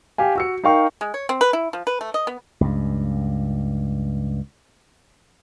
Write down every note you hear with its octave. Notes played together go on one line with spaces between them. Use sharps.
G4 F5 G#5
F#4 E6 C#7
D#4 A#4 F5 G5 C#6
G#3
C#5
C4
B4
E4
F3
B4
A3
D#5
B3
C#2 G2